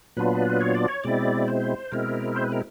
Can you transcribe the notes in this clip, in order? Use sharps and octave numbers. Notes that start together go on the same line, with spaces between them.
A#2 F#3 B3 D4 F4 B4
C#5
D5
C#5
B2 G#3 C4 E4 D5
C5
B2 G#3 C4 E4 A#4
C5
B4
A#4